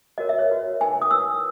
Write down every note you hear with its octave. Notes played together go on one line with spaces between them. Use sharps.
F#4 A#4 C#5 D#5
E5
C#5
F#4 B4
D#4 A#4 C#5 G#5
D#6
E4 B4 E6